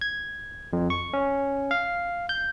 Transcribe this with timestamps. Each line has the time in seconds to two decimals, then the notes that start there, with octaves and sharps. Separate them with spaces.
0.01 G#6
0.73 F2
0.90 C#6
1.13 C#4
1.71 F5
2.29 G6